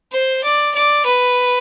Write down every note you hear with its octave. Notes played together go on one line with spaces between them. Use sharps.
C5
D5
D5
B4